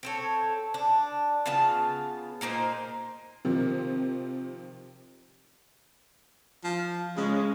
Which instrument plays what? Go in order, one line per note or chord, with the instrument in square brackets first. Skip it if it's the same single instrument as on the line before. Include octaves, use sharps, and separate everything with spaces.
[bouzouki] C4 A4 C#5
D4
C#3 B3 F4 A5
A#2 A#3 D#4 C5
[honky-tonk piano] C3 D#3 F3 [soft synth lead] C4
[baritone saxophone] F3
[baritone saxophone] C#3 [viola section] G#3 C#4